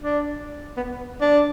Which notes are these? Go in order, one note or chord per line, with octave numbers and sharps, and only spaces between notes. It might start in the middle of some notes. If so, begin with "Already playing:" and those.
D4
B3
D4